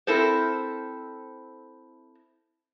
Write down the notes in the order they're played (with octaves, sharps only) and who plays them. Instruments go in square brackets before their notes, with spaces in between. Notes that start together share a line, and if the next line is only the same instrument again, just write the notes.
[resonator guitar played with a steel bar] C4 E4 A4 A#4 C5